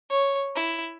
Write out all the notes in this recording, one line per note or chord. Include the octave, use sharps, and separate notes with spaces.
C#5
E4